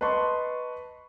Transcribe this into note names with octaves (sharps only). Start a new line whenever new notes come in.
B4 D#5 A5 C6 C#6